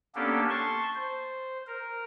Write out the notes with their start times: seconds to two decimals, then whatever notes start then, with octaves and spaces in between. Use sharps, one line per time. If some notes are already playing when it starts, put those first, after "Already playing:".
0.15 A#3 B3 C#4 D4 G4 A4
0.50 A5 C6 C#6
0.95 C5
1.67 A#4